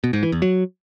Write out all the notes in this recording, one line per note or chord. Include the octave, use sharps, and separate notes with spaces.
B2
G#2
E3
E2
F#3